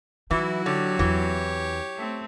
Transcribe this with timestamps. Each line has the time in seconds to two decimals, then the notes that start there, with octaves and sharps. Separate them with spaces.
0.31 E3 F#3 D#4 E4 F#4
0.66 D3 G4 C#5
0.99 E2 E3 C4
1.96 A3 C4